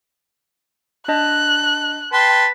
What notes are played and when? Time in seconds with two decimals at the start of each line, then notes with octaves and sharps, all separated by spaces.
1.08 D4 D#5 A5 F#6
2.13 B4 G5 A5 C6